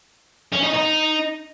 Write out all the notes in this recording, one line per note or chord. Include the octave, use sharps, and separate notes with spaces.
C#4
D#4
D#4